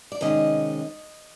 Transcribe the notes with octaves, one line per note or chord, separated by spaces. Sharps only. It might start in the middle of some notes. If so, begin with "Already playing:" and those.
D5
C3 D#3 G#3 C#4 D#5